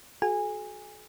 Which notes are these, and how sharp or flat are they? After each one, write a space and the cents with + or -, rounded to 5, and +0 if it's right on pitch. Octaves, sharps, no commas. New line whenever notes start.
F#4 +0 A4 -45 G#5 -20